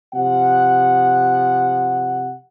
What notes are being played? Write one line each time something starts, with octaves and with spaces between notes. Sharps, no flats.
C3 F3 F#5